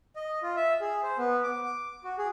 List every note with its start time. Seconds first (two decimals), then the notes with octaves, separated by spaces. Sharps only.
0.16 D#5
0.43 F4
0.56 E5
0.81 G#4
1.03 C5
1.18 B3
1.43 D6
2.04 F#4
2.18 G#4